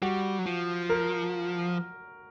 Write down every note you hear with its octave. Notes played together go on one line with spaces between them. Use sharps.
G3 F#4
F#3
F3
A#4